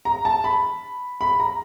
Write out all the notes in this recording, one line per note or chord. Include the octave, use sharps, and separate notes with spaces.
A#5
A5
B5
B5
A#5